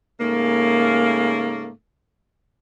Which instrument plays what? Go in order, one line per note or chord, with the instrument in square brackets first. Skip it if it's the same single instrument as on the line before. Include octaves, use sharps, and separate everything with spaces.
[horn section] G#2 C#3 A3 A#3